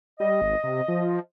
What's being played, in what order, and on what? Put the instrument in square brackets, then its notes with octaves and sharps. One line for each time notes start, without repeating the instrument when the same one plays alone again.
[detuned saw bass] G3 [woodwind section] D#5
[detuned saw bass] G#1
C3
F3